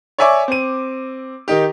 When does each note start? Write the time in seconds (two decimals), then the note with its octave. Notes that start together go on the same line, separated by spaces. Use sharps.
0.18 C#5 D5 E5 G#5 C#6 D6
0.48 C4 D#7
1.48 D#3 D#4 G4